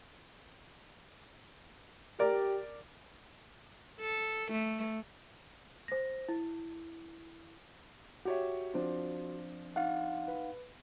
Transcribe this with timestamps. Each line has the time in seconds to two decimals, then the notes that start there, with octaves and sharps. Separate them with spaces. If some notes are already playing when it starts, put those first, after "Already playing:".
2.19 G4 A#4 D5
4.00 A4
4.51 A3
5.88 C5 A#6
6.29 E4
8.25 F#4 G4 C#5 E5
8.74 F3 C4 D4
9.76 D#4 F5 F#5
10.28 B4